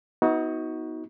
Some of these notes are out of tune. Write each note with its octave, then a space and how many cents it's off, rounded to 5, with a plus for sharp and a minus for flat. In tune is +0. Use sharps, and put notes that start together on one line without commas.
B3 +0 D#4 +35 F#4 +0